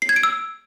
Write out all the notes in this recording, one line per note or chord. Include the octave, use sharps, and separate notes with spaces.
C7
G#6
D7
E6